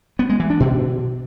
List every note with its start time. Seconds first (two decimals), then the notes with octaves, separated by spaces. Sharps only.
0.19 B3
0.29 G#3
0.40 E3
0.50 D4
0.60 B2